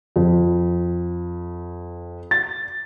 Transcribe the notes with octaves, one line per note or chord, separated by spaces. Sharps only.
F2
A6